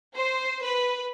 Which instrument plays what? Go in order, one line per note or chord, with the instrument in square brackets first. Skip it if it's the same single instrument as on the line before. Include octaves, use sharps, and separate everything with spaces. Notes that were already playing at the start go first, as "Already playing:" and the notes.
[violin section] C5
B4